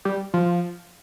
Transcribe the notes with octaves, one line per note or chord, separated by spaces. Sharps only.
G3
F3